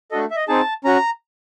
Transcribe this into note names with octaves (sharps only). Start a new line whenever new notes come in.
A3 D4 F#4 A4 D#5
E5
D#5
C4 D#4 G#4 A5
C#4 F#4 A#5